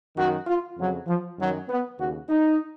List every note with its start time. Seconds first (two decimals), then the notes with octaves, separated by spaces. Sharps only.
0.16 F#2 D#3 F#4
0.46 F4
0.77 F2 C#3 F#3
1.07 F3
1.38 F#2 D#3 F#3
1.69 B3
1.98 D#2 C#3 F#4
2.29 D#4